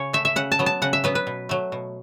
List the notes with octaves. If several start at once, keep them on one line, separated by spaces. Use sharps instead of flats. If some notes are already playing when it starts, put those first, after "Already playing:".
Already playing: C#3 C#4 C#5
A3 E5
E5
C#3 F#5
A5
F#3 B3
A5
C#3 F#5
E5
F#3 B3 B4
B4
B2
F#3 A3
B2